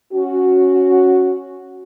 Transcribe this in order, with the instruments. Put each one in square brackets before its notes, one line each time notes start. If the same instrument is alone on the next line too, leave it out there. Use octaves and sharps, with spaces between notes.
[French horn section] C#4 F#4